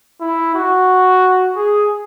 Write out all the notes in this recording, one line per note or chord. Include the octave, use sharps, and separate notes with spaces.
E4
F#4
G#4